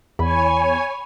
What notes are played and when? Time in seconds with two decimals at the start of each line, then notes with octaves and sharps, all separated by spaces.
0.19 E2 C#5 G#5 B5